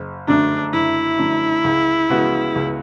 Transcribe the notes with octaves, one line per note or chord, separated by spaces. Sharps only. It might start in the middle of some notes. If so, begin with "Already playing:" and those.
Already playing: F#1
F#2 D3 A3 D4
F#1 E4
F#2 D3 A3
C#2
C#3 G#3 B3 F#4
C#2